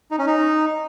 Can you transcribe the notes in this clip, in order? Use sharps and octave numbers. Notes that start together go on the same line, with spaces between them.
D#4
C#4
D#4